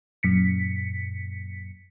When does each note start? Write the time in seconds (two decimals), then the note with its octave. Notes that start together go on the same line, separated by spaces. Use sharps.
0.23 F#2 A#2 B6 C#7